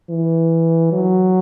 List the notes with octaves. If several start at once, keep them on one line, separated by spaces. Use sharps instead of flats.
E3
F#3